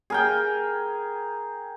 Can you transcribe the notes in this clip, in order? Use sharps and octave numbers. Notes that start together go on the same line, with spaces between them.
G#4 A#4 G5